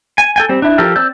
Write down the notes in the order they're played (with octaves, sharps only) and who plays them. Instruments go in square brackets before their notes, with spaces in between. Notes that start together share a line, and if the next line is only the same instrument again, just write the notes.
[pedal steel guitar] G#5
A4 G5 G#5
G3 C4
D4 E4
F3 G4 A4 A#4
C4 D5 E6 G6